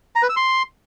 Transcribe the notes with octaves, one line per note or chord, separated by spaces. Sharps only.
A#5
B4
E6
C6